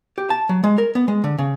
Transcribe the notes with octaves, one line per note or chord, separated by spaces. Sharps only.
G4
A5
F#3
G#3
A#4
B3
G#3
D3
C#3